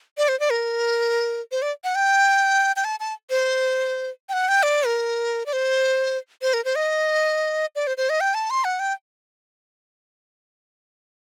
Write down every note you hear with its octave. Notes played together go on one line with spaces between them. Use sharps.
D5
C5
D5
A#4
C5
D5
F#5
G5
G5
A5
A5
C5
G5
F#5
G5
D5
A#4
D5
C5
C5
A#4
C5
D#5
D5
C5
C5
D#5
G5
A5
C6
F#5
G5